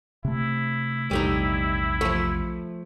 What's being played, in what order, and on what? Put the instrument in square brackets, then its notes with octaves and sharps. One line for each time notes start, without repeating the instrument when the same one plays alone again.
[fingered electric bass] C3 A3 [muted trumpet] E4
[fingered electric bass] A#1 E2 C3 [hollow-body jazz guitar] G3 A3 D#4
[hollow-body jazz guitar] F3 A3